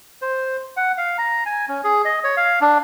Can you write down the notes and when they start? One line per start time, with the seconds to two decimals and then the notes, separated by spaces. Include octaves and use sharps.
0.22 C5
0.77 F#5
0.98 F5
1.18 A#5
1.46 G#5
1.69 C#4
1.84 G#4
2.05 D#5
2.24 C#5
2.37 F5
2.61 D4